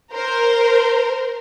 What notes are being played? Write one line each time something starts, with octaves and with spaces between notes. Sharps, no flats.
A#4 C5